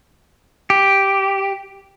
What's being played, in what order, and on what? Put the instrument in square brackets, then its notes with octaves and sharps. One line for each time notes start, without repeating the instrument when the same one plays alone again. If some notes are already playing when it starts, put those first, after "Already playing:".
[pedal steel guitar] G4